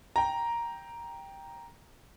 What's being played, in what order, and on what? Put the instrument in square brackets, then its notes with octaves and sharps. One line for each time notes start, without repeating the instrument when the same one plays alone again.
[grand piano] G5 A#5